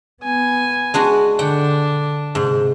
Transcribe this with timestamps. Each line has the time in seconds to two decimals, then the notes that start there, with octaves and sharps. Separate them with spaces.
0.23 B3 G#5
0.94 G#3 D4 F#4
1.39 D3 D4 F#5 G5
2.35 G#2 C3